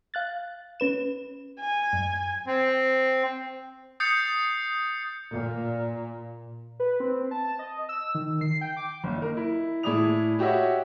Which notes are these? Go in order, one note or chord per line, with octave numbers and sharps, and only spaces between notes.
F5 F#6 A6
C#4 B4 E7
G#5
F#2
C4
D#6 G6 A6 C7 C#7
A#2
B4
C4
A5
A5
D#5
E6
D#3
C7
G5
D6
F#1
D#4 A#4
E4
A2 E4 G#4 D5 D#6 F7
F#4 G4 C#5 D#5 E5